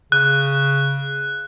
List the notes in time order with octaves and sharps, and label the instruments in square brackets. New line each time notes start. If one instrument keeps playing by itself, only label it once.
[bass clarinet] C#3 [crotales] F#6